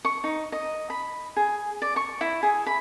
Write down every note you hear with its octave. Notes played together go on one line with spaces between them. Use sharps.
C#6
D#4
D#5
B5
G#4
D5
C#6
E4
G#4
B5